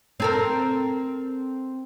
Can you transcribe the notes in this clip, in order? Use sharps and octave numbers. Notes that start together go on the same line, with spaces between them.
C4 A4 A#4